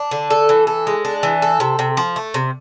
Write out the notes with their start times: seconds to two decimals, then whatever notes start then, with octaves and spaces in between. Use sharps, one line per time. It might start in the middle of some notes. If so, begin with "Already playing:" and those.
Already playing: D4
0.11 D3
0.30 A4
0.49 E3
0.67 A4
0.87 G#3
1.05 D4
1.23 E3
1.42 A4
1.60 C3
1.79 C3
1.97 F3
2.16 A3
2.34 C3